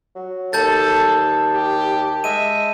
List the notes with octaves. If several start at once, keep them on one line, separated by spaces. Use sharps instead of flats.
F#3
D#2 A4 A5 G6 A6
G4
G#3 E5 D#7